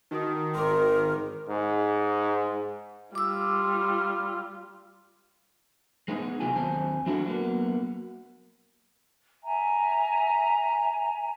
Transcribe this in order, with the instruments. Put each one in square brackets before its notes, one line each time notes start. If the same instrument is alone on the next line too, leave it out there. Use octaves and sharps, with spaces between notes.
[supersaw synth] D#3 [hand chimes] D#4 F#4 D#6
[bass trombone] G#1 [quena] A#4 [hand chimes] C6 D6
[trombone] G#2
[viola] G3 F4 [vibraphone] D6 E6
[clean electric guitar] G#3 B3 D#4 G#4
B1 C3 F#3 B3 F4 G#5
D#2 F#3 C4 C5 G#5 A5
F#3 D4 E4 F#4 A4
F#3 A#3 B3
[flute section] E5 G#5 A#5